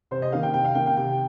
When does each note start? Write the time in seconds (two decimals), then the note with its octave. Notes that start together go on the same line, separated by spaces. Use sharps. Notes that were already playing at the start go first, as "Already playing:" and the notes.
0.11 C3 C5
0.22 D#5
0.32 D#3 A#3 F5
0.43 G5
0.54 C3 G5
0.64 F5
0.75 D#3 A#3 G5
0.86 G5
0.97 C3 G5